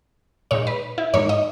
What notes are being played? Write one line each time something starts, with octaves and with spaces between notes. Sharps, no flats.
A#2 G#3 D#4 C#5
B4
E4
G#2 E3 A#3 D#4 C#5
D#5